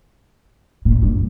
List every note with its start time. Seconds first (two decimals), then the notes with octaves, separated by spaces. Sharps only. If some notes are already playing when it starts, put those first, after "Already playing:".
0.85 A#2
1.02 G2